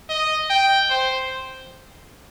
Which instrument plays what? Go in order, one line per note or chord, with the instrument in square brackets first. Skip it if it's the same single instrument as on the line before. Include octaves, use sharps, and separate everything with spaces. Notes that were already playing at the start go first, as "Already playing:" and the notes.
[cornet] D#5
G5
C5